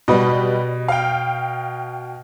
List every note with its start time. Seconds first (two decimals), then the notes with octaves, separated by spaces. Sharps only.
0.08 B2 G3 B4 D#5
0.88 F5 G5